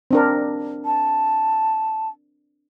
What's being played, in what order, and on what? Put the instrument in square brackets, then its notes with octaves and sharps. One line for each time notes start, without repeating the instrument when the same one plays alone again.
[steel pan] C4 D4 A#4
[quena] A5